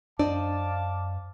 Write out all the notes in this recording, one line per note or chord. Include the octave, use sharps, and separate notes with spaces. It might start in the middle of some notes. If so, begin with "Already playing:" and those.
F#2 D4 C5 D5 D#5 F5 A5 D6